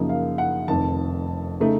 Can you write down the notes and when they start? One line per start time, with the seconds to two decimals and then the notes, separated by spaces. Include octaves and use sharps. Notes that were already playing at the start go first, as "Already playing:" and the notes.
Already playing: F#2 C#3 F3 A#3 D#4
0.09 F5
0.38 F#5
0.68 F1 F2 D#3 A5
1.60 C#3 A3 D#4